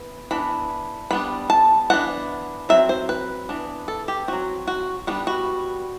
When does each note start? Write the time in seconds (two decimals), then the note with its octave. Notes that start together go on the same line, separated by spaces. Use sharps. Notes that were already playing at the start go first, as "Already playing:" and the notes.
Already playing: E3 B3
0.31 E3 B3 D4 B5
1.11 G3 B3 D4 B5
1.50 A5
1.90 E3 B3 D4 F#5
2.69 F#3 C4 E5
2.89 C5
3.09 B4
3.49 E3 B3 D4
3.88 A4
4.08 G4
4.28 F#3 C4 F#4
4.68 F#4
5.07 G3 B3 D4 F#4
5.27 F#4